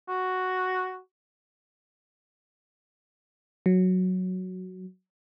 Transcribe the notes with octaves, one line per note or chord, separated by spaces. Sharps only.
F#4
F#3